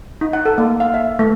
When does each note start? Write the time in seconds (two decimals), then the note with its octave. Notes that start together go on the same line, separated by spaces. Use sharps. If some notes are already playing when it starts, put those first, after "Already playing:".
0.21 D#4
0.33 F#5
0.45 A4
0.58 A#3
0.80 F5
0.94 E5
1.19 A3